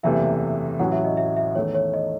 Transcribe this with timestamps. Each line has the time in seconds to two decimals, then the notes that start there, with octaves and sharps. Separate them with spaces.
0.03 F#1 E2 C3 E3 A3 E5
0.79 A1 A2 F#3 C#4 F#4 F#5
0.92 E5
1.05 D#5
1.17 E5
1.37 E5
1.55 E2 D#3 A3 C#5
1.75 C#5
1.94 D#5